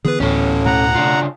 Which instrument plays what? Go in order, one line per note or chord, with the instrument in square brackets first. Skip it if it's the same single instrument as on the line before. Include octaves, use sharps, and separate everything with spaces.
[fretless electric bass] D3 E3 B3 [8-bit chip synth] G#4 B4
[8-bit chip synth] D2 A2 [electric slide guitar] C#4 A4
[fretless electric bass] B2 A3 [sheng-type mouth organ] F#5 A#5
[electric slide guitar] C#3 D4 F4